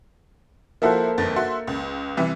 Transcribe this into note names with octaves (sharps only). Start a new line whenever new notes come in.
F3 A#3 E4 F#4 A4 C5
G1 F2 A6
F#4 E5 C6
C#2
C3 E3 G3